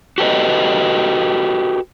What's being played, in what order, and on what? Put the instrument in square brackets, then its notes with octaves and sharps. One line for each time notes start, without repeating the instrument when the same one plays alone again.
[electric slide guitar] F#4 G4 A4 B4 D#5